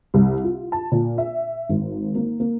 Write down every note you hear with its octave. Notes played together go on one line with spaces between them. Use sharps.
C2
F4
A5
A#2
E5
G#1
A#3
A#3